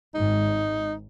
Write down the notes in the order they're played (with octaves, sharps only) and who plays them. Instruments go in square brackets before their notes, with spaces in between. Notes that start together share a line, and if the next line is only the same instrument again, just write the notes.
[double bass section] G#1 G#2 [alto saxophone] D#4